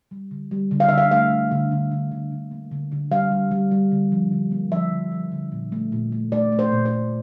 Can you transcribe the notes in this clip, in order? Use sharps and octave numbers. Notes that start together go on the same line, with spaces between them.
G3
D3
G3
D3
F5
D3 E5
F5
A3 F5
A3
D3
D3
D3
D3
D3
A#3
D3
D3
G3 F5
G3
G3
G3
D3
F3
D3
A#3
F3 E5
D3
F3
D3
A#2
A3
A#2
A3
A3 D5
A3
C5
A#2
C5
A3